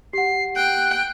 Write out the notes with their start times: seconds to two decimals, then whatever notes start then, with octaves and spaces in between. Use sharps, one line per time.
0.13 G4 F#5 C7
0.56 G5 F#6